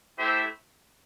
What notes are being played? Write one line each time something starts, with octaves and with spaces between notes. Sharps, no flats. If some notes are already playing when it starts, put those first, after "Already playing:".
A3 E4 G4 C5 E5